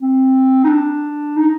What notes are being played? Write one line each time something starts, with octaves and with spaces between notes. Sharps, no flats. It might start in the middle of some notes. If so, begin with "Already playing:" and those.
C4
D#4
D4
D#4